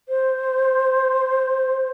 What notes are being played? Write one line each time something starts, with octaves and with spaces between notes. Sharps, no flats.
C5